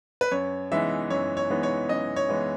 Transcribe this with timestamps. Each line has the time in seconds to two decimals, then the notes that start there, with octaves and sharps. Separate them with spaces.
0.21 B4
0.32 F#2 C#5
0.72 E3 G#3 B3 D#4 E5
1.10 F#2 C#5
1.37 C#5
1.50 E3 G#3 B3 D#4
1.63 C#5
1.89 F#2 D#5
2.16 C#5
2.29 E3 G#3 B3 D#4